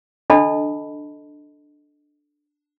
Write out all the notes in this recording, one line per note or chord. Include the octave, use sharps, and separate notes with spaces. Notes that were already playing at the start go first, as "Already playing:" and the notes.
D4 A4 D#5 A5 B5